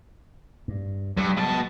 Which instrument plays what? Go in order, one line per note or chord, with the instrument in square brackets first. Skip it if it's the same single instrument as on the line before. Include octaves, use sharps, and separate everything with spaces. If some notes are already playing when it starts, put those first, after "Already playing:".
[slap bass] G2
[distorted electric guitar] G2 [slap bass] F#3 G#3
[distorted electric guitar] B2 A5